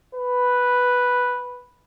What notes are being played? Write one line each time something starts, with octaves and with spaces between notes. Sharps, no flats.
B4